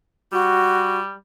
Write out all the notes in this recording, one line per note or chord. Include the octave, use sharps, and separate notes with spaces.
G3 F#4